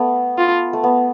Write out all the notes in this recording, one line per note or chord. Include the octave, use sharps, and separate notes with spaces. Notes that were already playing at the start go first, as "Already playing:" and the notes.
Already playing: A3 B3
F4
A3
B3